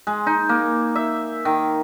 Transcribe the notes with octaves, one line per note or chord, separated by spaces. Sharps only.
G#3
D#4
A#3
E5
D#3